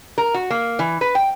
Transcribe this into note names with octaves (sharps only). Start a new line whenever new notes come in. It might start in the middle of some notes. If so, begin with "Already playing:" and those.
A#4
F#4
A#3
E3
B4
G5